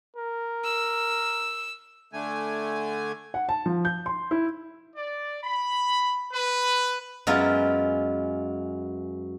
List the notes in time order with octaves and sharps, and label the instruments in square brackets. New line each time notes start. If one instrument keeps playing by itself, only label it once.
[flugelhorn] A#4
[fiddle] E6
[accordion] D3 A3 G#5
[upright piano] F#5
A5
F3
G6
C6
E4
[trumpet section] D5
B5
B4
[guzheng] F#2 G#3 B3 F4 E5 A#5